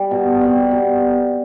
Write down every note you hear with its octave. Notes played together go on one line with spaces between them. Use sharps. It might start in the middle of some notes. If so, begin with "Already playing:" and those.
Already playing: G3
B2
G3 C4
B2